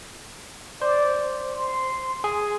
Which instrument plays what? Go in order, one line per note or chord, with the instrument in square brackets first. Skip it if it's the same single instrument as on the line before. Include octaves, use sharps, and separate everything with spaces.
[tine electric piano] C5 [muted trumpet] D5
[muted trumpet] C6
[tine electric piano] G#4